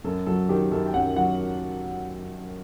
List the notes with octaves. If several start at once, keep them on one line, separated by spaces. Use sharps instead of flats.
F#2 A4
F#3 A4
D#3 G4
F#2 A4
G5
F#2 F#5
F#3 F#5